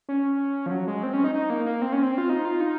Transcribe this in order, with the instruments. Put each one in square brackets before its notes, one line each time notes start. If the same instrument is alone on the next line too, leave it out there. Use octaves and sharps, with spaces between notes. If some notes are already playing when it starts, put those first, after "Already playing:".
[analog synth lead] C#4
F3
F#3
G#3
C4
C#4
D#4
D#4
A#3
A#3
C4
C#4
C4
F4
D#4
F4
D#4